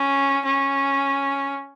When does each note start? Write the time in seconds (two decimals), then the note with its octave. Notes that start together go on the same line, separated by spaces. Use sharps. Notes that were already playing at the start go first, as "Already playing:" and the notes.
Already playing: C#4
0.45 C#4